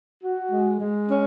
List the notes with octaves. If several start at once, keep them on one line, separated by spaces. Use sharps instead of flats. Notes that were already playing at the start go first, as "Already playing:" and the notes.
F#4
G#3
G#3
C#4